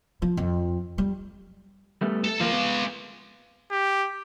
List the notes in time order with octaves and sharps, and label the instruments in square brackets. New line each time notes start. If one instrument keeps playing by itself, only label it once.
[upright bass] F3
F2
G3
[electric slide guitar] G3 A3 B3
[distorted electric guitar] A4
[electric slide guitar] F3 A#3 [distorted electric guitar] G#3 F5
[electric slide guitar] B3
[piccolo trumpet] G4